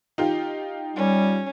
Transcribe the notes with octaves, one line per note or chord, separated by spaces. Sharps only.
D#4 F4 G4
G3 C#4